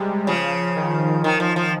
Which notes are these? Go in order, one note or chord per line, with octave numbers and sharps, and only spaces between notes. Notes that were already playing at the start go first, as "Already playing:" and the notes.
Already playing: C3 G3 G#3
C#3 F3
D#3
D#3
F3
F3